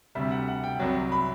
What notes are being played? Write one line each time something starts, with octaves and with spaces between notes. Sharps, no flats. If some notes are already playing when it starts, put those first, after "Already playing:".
D2 C3 G3 E5
F#5
F#5
G5
C2 C3 F#3
B5